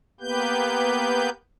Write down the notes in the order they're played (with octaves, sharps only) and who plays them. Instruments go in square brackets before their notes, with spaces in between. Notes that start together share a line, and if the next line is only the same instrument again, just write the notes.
[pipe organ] A#3 B3 G4 B4 G6